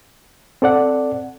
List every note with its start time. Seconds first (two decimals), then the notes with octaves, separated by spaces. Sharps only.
0.62 C4 A4 D5 F#5